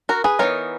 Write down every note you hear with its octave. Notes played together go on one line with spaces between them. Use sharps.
F#4 A#4
G#4 B4
E3 B3 D#4 A#4 C#5